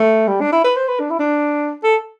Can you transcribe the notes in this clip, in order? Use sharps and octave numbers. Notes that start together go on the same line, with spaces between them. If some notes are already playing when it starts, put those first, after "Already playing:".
Already playing: A3
G3
D4
E4
B4
C5
B4
D4
E4
D4
A4